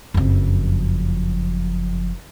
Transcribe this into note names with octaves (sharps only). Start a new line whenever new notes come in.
F#1 F2